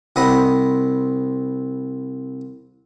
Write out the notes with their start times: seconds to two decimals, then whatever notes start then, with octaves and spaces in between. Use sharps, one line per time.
0.16 C2 C4 D#5 F#5 B5